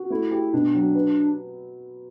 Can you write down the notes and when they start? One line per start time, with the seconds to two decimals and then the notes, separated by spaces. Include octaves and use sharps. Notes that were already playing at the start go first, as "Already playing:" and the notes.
Already playing: F#4
0.10 A3 E4
0.31 G4
0.53 B2 D4
0.75 F#3
0.95 B4